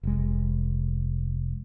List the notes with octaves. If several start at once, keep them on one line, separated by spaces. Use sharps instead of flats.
F1 G#3